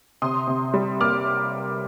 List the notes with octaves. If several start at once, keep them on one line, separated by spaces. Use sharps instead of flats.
C3 C6 D#6
C3
G3
A#3 D6 F6